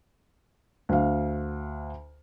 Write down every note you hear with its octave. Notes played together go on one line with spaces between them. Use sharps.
D2 F5